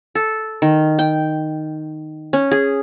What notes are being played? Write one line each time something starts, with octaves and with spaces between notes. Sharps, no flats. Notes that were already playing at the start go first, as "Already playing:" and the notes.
A4
D#3
G5
C#4
G#4